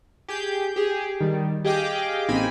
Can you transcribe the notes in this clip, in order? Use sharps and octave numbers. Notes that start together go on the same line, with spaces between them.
G4 G#4 G6
G4 G#4
D#3 G3
G4 G#4 D#5 F5 G5 D6
A1 A#3 C4 D#4 G#5 B5